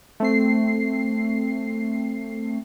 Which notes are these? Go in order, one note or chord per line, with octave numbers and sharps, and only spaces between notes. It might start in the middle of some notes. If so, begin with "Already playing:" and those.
A3 C4 C7